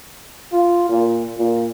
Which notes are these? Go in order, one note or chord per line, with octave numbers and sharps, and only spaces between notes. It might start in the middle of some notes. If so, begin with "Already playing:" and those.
F4
A#2
A#2